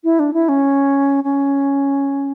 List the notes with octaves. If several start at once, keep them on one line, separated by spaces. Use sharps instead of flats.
E4
D4
E4
C#4
C#4